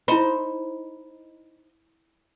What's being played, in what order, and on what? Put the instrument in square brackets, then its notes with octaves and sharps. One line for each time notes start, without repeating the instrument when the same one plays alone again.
[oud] D#4 C5 [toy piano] E4 B5